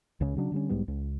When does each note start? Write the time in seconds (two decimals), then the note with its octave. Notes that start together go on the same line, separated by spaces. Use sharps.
0.20 C#2 C#3 C#4
0.36 C#3 F#3 C4 D4
0.52 D3 G3 C#4
0.69 B1 G#2 G3 B3
0.88 C#2